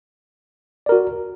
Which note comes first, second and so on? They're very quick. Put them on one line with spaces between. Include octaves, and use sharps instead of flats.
D5 A#4 F#4